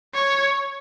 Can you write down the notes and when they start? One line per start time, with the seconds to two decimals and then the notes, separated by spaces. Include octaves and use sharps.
0.14 C#5